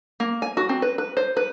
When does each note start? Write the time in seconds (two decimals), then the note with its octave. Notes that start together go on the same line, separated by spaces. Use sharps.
0.20 A#3
0.42 G#5
0.57 F#4
0.69 C4
0.82 B4
0.98 B4
1.17 C5
1.37 B4